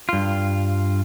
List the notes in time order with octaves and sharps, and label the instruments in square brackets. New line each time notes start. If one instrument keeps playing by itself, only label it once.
[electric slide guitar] G2 F4